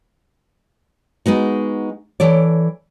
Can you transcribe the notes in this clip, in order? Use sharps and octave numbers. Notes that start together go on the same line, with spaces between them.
G#3 B3 D#4 F#4
E3 A4 C#5 D5